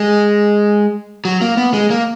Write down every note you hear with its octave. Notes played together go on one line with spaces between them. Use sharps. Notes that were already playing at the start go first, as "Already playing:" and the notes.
Already playing: G#3
F#3
A#3
B3
G#3
A#3